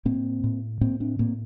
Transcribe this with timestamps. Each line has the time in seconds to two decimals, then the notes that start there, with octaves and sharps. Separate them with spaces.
0.05 A2 A#3 C4
0.44 A2
0.81 A2 A#3 C4
1.00 C4 D4
1.19 A2 A#3 C4